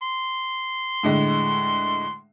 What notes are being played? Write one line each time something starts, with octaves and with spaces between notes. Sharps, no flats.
C6
A2 D3 G#3